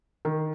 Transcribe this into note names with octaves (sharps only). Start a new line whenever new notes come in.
D#3